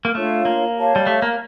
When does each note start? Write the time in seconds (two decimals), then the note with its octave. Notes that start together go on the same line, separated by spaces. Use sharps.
0.05 A#3
0.15 A3 D4 F4 C#5 F5
0.45 A#3
0.77 G4 C#5 F5 A5
0.96 G3
1.07 A3
1.22 A#3